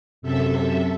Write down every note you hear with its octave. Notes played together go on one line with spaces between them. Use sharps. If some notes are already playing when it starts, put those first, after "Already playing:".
F#2 C3 A4 E5